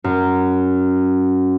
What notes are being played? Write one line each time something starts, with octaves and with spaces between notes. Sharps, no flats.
F#2